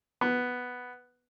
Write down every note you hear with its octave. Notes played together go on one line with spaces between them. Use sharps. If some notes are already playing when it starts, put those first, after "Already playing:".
B3